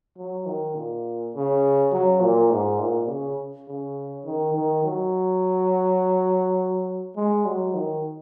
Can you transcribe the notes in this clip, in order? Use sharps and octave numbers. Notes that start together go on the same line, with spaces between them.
F#3
D#3
A#2
C#3
F#3
A#2
G#2
A#2
C#3
C#3
D#3
D#3
F#3
G#3
F#3
D#3